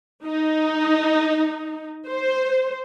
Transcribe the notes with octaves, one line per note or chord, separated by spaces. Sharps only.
D#4
C5